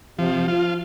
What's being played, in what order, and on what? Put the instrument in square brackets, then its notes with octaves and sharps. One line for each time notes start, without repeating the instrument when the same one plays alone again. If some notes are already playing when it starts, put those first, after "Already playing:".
[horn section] C3 [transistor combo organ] F3
[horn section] F3 [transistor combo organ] F4